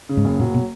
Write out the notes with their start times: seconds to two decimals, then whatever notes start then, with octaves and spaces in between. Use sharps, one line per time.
0.09 C#3
0.17 G#2
0.24 F#1
0.40 A#2 F#3
0.54 B2